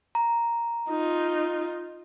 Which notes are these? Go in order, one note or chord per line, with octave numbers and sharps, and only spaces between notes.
A#5
D#4 F4